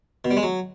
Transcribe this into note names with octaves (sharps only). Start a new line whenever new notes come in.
B2
G3
G#3
F#3